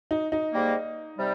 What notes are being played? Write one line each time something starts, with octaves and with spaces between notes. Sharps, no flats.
D#4
D#4
G#2 G3 A#3
C3 G3